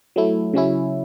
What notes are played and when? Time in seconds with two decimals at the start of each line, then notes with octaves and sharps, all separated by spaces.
0.16 F#3 A3 E4
0.54 C#3 F#3 C#4 E4